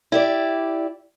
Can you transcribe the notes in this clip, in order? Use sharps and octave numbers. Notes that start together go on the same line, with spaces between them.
E4 G4 D5